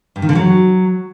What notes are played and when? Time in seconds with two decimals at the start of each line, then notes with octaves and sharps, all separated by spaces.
0.16 G2
0.22 D#3
0.29 D3
0.35 F#3